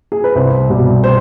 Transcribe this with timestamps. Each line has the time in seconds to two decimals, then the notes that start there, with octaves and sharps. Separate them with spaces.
0.12 G#4
0.24 B4
0.35 C2 C5
0.70 B2 G3
1.04 C5